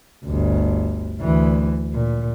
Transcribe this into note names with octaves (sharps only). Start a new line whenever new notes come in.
G1 D2
D2 E3
A#2